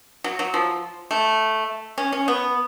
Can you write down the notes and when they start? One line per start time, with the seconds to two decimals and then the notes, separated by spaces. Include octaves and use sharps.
0.24 F#3
0.39 F#3
0.54 F3
1.11 A3
1.98 C#4
2.12 C#4
2.28 B3